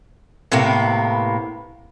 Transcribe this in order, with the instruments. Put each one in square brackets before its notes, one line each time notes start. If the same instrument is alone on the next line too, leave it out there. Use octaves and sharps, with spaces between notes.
[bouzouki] A2 C3 A#3 B3